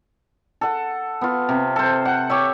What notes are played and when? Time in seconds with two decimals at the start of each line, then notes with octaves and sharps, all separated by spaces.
0.61 A4 F#5
1.21 B3 F4
1.49 C3
1.76 A4 C5
2.05 F#5
2.30 G4 C#5 E5